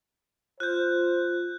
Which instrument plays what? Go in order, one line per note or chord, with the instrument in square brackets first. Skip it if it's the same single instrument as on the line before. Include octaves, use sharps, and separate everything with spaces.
[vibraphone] F4 [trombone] C5 [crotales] F#6 G6